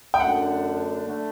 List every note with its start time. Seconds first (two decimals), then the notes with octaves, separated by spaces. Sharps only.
0.14 G5
0.20 F#2 D3 A3 D4 F#5
1.06 D3 A3 D4